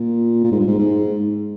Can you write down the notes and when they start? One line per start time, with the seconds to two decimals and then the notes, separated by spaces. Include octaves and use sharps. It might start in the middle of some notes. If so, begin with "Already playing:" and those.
Already playing: A#2
0.44 A#2
0.52 G#2
0.59 G2
0.67 G#2
0.78 G#2